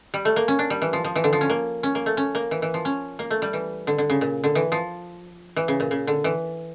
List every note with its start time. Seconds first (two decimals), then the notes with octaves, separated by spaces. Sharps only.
0.14 G3
0.25 A3
0.36 A#3
0.48 C#4
0.59 D4
0.70 G3
0.82 E3
0.93 F3
1.04 F3
1.16 E3
1.24 D3
1.33 F3
1.41 C#4
1.50 A#3
1.83 C#4
1.95 A#3
2.06 A3
2.17 C#4
2.35 A#3
2.51 E3
2.62 E3
2.74 F3
2.85 C#4
3.19 A#3
3.30 A3
3.42 G3
3.53 E3
3.87 D3
3.98 D3
4.10 C#3
4.21 A#2
4.44 D3
4.55 E3
4.72 F3
5.56 E3
5.68 C#3
5.80 A#2
5.91 C#3
6.07 D3
6.24 E3